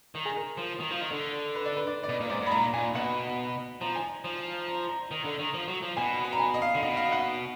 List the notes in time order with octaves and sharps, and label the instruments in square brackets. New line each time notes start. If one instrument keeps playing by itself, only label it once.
[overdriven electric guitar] D#3
[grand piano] G#4
A#4
[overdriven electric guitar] F3
D#3
F3
D#3
D3
[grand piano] B4
D5
B4
D5
D5
[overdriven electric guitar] B2 [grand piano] D#5
[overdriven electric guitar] A#2
[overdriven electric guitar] G#2 [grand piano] D5
[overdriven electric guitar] G#2
[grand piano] B5
[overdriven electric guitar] A#2 [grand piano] A#5
[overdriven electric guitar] A#2 [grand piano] G#5
[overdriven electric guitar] B2 [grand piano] F#5
[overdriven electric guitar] F3 [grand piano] A#5
[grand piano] G#5
[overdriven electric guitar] F3
[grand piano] A#5
A#5
[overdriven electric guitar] D#3
D3
D#3
F3
F#3
F3
[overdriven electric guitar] B2 [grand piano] G#5
[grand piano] B5
A#5
G#5
D#5
F5
[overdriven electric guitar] D3
[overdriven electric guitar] B2 [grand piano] D#5
[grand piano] F5
F#5